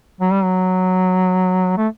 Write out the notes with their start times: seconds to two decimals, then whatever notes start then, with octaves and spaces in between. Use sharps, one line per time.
0.20 F#3
0.32 G3
0.44 F#3
1.77 A3